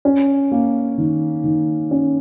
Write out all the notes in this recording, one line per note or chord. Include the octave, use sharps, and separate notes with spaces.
C#4
A#3
D#3
D#3
C#4